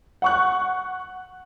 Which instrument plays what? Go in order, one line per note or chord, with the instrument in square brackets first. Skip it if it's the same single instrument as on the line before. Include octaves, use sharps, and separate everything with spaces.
[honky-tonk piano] F#5 C#6 F#6